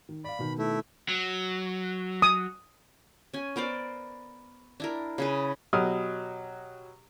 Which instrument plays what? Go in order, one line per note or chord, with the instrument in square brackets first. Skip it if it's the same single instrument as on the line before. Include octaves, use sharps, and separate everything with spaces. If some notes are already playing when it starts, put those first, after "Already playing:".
[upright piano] D#3
[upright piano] D5 F5 [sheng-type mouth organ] B5
[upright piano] B2 D#3
[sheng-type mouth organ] A3 E4
[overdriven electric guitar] F#3
[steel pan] D#6
[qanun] C#4 G#5
B3 A#4 C5 D5
D4 E4 A#4
C#3 G#4 B4
[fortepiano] B2 F#3 G4 D#6 F6